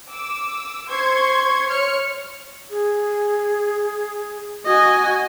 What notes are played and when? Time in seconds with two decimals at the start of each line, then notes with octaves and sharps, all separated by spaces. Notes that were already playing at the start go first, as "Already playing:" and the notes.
0.11 D6 E6
0.90 C5 C6 C#6 G#6
1.68 C#5 F6 C#7
2.70 G#4
4.66 F#4 D#5 G#5